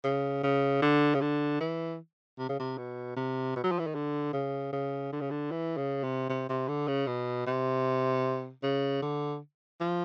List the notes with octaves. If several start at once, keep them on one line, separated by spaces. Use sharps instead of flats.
C#3
C#3
D3
C#3
D3
E3
C3
C#3
C3
B2
C3
B2
F#3
F3
E3
D#3
D3
C#3
C#3
D3
C#3
D3
E3
C#3
C3
C3
C3
D3
C#3
B2
C3
C#3
D3
F3